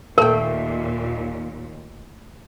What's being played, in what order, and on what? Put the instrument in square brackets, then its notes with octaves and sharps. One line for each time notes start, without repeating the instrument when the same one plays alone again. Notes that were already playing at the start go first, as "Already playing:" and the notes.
[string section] D#2 A#2 [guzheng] A3 G5 [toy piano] A#4